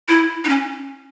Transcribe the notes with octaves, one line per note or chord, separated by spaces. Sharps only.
E4
D#4
C#4